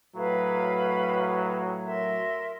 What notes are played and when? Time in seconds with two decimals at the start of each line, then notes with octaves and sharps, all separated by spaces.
0.15 A2 F#3 B4 F5 B5
1.84 A#4 E5 C6